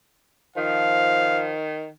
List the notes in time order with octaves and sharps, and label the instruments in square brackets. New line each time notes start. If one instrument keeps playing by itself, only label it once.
[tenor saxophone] D#3 [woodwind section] F3 [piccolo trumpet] F5